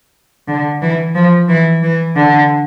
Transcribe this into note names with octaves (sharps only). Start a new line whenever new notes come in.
D3
E3
F3
E3
E3
D3